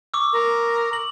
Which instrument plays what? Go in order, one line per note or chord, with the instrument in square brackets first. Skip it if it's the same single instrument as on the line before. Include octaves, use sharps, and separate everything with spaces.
[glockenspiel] C#6 D6 E6
[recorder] A#4
[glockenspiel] F#7